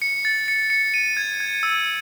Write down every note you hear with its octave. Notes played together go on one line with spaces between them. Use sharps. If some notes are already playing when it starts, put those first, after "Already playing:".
C#7
A6
C#7
C#7
D#7
G#6
G#6
E6